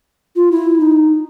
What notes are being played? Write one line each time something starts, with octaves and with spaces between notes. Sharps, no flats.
F4
E4
D#4